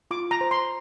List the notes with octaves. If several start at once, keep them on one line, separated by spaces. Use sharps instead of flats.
F4 D6
A#5
C5
C6